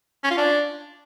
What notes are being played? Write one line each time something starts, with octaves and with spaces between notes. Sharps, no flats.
C#4
F4
D4